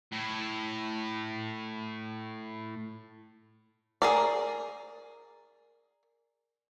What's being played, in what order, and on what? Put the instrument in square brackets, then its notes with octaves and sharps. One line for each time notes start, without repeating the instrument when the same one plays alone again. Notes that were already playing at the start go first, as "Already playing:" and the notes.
[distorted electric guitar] A2 E4
[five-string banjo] G#4 A#4 D5